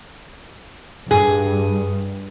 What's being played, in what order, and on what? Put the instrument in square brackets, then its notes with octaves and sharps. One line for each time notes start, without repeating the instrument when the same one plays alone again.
[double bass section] G2 [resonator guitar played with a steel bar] G#4